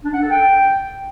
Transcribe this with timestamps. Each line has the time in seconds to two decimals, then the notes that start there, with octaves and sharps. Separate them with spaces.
0.04 D4
0.13 F#5
0.22 A4
0.31 G5